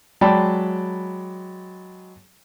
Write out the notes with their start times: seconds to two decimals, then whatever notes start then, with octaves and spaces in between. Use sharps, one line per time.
0.21 F#3 G#3 D5 G5 A5 B5